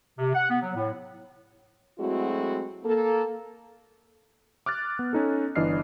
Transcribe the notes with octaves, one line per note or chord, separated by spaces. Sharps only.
C3
F#5
B3
F#3
A2
F#3 G#3 A3 C4 E4 F#4
A#3 A4
D6 F6 F#6 A6
B3
C#4 D#4 A4
G1 E3 D4 D#5 F6 C7